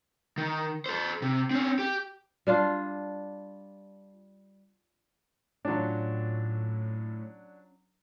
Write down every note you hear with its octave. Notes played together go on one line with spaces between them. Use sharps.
D#3
A4 C5
C3
C4 C#4
G4
G3 D4 F4
A2 F#3 C#4 D4 F4